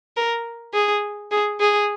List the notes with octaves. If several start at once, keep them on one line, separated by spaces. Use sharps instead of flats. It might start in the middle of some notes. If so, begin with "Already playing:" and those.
A#4
G#4
G#4
G#4